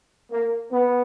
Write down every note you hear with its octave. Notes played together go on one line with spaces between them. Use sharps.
A#3
B3